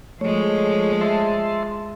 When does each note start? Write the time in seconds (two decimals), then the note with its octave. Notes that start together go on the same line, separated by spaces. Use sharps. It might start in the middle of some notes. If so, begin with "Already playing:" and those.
0.21 F3 G#3 A3 C#5
1.01 E5 A5 C6